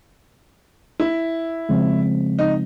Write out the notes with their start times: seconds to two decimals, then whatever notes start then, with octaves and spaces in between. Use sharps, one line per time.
1.00 E4
1.69 C#3 F3 G#3 C4
2.39 D#4